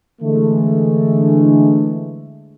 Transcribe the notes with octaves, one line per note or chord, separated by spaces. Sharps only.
D3 E3 G#3 A3